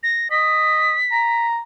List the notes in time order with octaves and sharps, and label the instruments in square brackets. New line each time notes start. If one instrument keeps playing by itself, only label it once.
[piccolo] A#6
[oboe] D#5 [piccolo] B6
[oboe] A#5